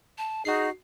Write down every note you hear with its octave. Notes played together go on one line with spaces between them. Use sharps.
A5
D#4 F#4 G#4 C7